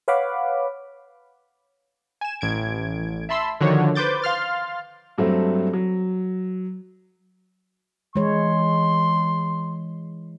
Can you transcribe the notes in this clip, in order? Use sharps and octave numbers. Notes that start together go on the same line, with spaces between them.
B4 C#5 F5 F#5 B5 D6
G#5 E7
A1 G#6 D7
E5 A5 B5 C6 E6
D3 D#3 F3 F#4 C#5
B4 C5 D6 G6 A6
F5 C6 F6 A6
G2 F#3 A3 C4
F#3
E3 G#3 C#5 C6